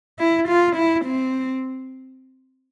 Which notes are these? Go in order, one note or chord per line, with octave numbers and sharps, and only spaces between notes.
E4
F4
E4
C4